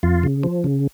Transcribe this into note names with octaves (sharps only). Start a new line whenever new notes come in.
F2 F4
C#3
F3
C#3